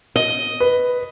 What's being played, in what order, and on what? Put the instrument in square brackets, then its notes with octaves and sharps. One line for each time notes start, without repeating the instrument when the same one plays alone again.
[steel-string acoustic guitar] D#5
[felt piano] B4